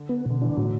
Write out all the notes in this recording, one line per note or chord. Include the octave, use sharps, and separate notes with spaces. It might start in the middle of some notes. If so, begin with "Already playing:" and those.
Already playing: D3
B3
B2 D3
E3 D4
A2 D3 F#3